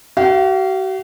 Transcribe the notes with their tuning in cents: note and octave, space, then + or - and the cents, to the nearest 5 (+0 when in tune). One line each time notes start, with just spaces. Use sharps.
F#4 +45 F5 -20